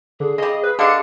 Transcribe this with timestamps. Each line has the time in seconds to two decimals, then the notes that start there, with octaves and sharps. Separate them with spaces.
0.20 D3 G#4
0.38 C#3 G3 D#5
0.63 B4
0.79 D3 D4 G4 D#5 F5 C#7